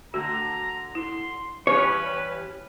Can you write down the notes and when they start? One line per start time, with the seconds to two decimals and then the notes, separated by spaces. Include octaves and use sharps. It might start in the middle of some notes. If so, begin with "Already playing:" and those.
0.14 D3 A3 F#4 A#5
0.95 E4 C6
1.67 E3 G3 C#4 B4 C#5